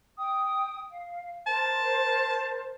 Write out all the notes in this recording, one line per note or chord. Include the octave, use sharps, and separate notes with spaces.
G5 D#6
F5
A#4 C5 A5